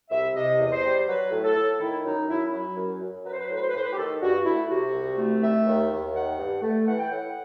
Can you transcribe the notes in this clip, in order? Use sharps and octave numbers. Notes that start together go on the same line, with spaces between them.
C2 E5
C3 D#5
E2
D#5
C5
G3
F#3 B4
A2
A4
A2
D#3 E4
F#2 D#4
F#2 E4
F#3 E4
F#2
F#2
F#3 B4
C5
B4
C5
A2
B4
C5
B4
A2 C5
B4
G4
D#3 A4
G2 F#4
A3 E4
C3 F#4
C2
A3
D#3 E5
D#2
D#2
D#3 F#5
G2
A3
E3 F#5
G5
A2 F#5